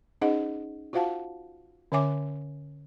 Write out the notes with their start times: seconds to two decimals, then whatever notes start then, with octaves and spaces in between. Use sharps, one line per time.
0.21 C#4 D#4 G#4 C5 D#5 F#5
0.93 F4 F#4 C5 F5 F#5 A5
1.92 D3 C#4 C#5 E5 G#5 D6